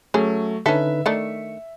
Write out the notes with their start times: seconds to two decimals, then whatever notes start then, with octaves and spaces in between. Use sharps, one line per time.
0.14 F#3 A3 C#4 G#4
0.66 D3 C#4 D#4 A4 B4 E5 B6
1.06 D#3 A3 D4 C#7